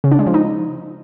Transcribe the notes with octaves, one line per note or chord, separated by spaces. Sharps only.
C#3
D4
G#3
F3
D#4